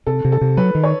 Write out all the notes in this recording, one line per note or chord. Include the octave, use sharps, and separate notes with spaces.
C3 A4
C3
A4
C3
F#3 B4
D#3
C#5